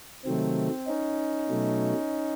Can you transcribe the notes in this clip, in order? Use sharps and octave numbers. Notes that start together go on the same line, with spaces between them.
C3 D#3 F#3 A3 C4
C#4 D#4
B2 F#3 A3